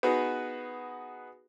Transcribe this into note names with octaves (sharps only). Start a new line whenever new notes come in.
B3 D#4 F#4 G#4 B4